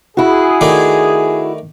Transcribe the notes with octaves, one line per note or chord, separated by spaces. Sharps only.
E4 F#4 G#4
D#3 A3 D4